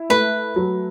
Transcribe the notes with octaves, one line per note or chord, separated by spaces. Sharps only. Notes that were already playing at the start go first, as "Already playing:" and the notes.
Already playing: E4
A3 B4
F#3